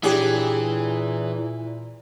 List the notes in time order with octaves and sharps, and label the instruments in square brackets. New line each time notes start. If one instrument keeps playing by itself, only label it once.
[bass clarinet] A#2 [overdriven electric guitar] E3 [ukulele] D4 G4 [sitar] G#4 C#5